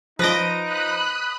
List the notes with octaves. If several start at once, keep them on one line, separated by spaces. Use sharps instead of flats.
F3 D#4 B4 D#5 A#6 D7
B5 D#6 F#6